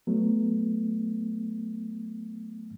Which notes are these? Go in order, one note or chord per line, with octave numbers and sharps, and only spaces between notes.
F#3 A3 B3